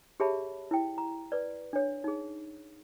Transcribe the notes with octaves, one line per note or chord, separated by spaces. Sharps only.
G4 G#4 C#5 E5 A5 B5
E4 G5
A#5
B4 D5
D4 C#5
D#4 G#4